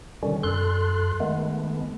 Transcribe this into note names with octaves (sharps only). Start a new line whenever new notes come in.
B2 D3 D#3 G3 C#4
F#2 A4 C6 F#6
D#3 G#3 A3 B3